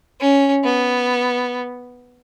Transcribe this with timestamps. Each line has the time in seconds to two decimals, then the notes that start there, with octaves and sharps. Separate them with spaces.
0.20 C#4
0.65 B3